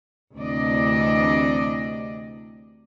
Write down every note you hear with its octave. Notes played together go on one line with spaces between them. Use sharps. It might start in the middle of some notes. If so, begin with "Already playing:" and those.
D2 C3 E3 D4 D5 D#5